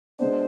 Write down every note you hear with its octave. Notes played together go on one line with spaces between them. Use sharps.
B2 G#3 B3 D4 C5